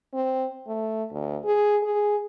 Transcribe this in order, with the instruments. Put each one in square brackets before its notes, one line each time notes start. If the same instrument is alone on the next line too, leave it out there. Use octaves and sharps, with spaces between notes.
[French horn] C4
A3
D2
G#4
G#4